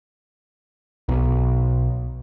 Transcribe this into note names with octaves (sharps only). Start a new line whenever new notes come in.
B1